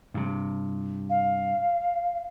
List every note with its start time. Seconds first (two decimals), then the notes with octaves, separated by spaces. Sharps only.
0.14 G2 C3
1.10 F5